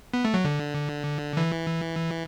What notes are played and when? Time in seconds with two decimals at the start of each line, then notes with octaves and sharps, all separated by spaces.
0.14 B3
0.25 A3
0.34 F#3
0.45 D3
1.37 E3